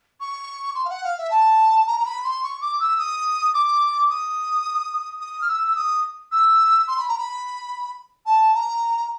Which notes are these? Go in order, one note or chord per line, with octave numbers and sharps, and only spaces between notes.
C#6
C6
F5
F#5
F5
E5
A5
A#5
A#5
B5
C6
C#6
D6
E6
D#6
D6
D#6
D#6
F6
E6
E6
D#6
E6
C6
B5
A#5
B5
A5
A#5